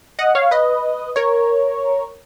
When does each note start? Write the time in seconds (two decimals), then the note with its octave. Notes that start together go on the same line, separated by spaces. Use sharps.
0.19 D#5 F#5
0.35 C#5 F5
0.51 B4 D#5
1.16 A#4 C#5